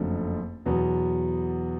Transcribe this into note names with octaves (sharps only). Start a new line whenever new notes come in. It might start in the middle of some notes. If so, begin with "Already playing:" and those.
Already playing: F#1 F2 D3 F#3 A3
E2 B2 F#3 B3